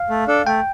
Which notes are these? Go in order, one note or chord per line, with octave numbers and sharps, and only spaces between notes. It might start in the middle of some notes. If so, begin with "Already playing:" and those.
Already playing: F5
A3
D4 A4
A3 G5